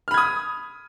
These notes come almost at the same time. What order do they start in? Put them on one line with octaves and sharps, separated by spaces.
F6 B5 G#6 D#6